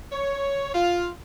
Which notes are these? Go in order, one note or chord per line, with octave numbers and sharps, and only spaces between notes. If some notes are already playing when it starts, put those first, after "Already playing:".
C#5
F4